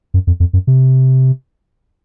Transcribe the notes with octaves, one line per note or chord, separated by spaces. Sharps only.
F#2
F2
F2
F#2
C3